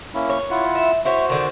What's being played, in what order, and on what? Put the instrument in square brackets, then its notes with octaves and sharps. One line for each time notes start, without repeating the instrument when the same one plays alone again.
[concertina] A#3 C#4 E4
[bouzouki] C#5
[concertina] E4 F4 F#5
[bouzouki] E5
[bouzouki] E4 C#5 [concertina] F#4 C5
[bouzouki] D3 D#3